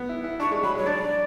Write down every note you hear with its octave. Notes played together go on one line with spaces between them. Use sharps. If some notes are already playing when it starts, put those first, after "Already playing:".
Already playing: B3
E4
E4
D4 C#6
G#3
F#3 B5
G#3 C#5
D4 D5